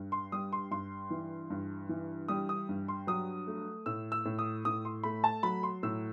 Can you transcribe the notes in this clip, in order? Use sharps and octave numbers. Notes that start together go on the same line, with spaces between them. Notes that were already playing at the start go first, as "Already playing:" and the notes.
Already playing: G2
C6
G3 D#6
C6
G2 C6
E3
G2
E3
G3 D#6
D#6
G2
C6
F#3 D#6
A3
A2 E6
E6
A2
D#6
A2 D#6
C6
A3 B5
A5
F#3 B5
C6
A2 E6